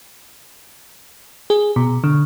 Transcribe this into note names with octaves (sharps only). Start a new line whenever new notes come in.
G#4
B2
D3